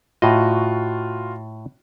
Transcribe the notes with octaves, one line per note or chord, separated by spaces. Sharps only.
A2 F4 F#4 D#5